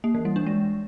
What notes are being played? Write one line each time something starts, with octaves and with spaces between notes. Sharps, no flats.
A#3
E3
G3
D4
G#3